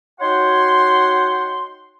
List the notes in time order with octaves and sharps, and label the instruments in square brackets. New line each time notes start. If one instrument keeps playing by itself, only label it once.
[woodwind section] D#4 F#4 C#5 F#5 G5 C6